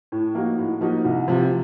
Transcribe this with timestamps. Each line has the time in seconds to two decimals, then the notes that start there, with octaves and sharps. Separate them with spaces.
0.12 A2
0.35 F3 A#3 D#4 F#4
0.58 A2
0.81 F3 A#3 D#4 F#4
1.05 C2
1.28 C3 F3